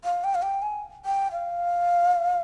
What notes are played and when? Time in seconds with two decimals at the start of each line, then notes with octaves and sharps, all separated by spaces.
0.04 F5
0.24 G5
0.35 F5
0.42 G5
0.62 G#5
1.05 G5
1.32 F5